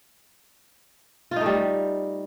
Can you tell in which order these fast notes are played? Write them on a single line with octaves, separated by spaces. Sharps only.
F4 D#4 A3 G3